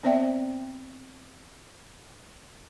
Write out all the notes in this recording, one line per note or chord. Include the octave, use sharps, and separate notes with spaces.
B3 C4 C5 D5 E5 G5